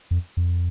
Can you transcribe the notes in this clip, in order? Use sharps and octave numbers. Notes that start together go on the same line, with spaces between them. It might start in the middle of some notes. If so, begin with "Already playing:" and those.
F2
F2